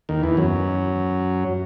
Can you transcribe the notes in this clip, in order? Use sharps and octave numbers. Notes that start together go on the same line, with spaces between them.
D#2 D#3
E2 E3
F#2 F#3